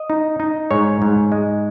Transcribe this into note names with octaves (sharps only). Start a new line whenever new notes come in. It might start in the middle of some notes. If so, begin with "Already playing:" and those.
Already playing: D#5
D#4
D#4
G#2 C#5
G#2
G#3